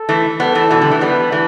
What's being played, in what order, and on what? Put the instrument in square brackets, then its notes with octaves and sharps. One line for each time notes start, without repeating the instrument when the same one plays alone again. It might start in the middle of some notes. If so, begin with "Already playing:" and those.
Already playing: [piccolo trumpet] A4
[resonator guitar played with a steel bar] E3 A3
[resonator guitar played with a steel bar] G3 B3 [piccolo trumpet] A4
[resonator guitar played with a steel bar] E3 A3
B2 E3
D3 G3
E3 A3
[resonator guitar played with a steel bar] G3 B3 [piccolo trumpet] B4
[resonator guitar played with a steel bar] E3 A3